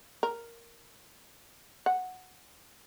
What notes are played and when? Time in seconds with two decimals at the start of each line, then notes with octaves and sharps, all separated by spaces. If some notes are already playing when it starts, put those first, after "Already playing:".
0.23 A#4
1.86 F#5